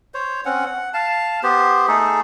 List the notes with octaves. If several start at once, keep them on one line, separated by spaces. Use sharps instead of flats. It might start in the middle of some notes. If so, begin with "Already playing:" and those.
C5 C#5
C4 C#4 F#5
F#5
F5 A5
B3 G4 C5
A3 D#4 G#4 A4